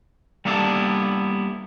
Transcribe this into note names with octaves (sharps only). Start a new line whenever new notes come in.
G3 A#3 B3 D4 E4 A4